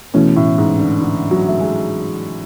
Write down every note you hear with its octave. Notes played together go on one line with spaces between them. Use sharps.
B2 E3 A3 C#4 E4
A2
G#2
D3
D3
F#3
A3
G#3